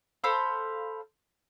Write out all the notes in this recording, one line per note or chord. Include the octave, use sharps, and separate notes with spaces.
A4 C5 F5 B5